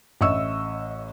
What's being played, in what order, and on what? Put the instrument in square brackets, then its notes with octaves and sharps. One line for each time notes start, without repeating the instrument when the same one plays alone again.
[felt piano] A1 D#5 E5 C#6 E6